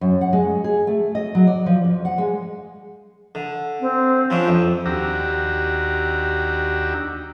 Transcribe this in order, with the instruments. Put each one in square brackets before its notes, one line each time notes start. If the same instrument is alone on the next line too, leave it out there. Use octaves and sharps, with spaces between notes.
[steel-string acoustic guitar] F#2
F#5
G#3
G#4
A3
D#5
F#3
D5
F3
F2
F#5
G#3
[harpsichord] D3
[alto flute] C4
[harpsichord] F3 C#4 D4
[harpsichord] F2 [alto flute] C4
[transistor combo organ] D#2 D4 F#4 G4 A#5 E6